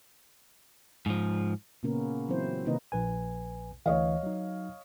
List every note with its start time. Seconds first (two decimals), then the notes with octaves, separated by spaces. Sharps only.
1.06 G#2 F3
1.83 A#2 C#3 A#3 B3 C#4 A#4
2.28 E3 F#3 C4 E4 C5
2.65 C3 D#3 A#3 D#4 B4 D#5
2.92 A#1 B4 G#5
3.86 D2 E3 C#5 D#5 F5
4.23 F#3 D#4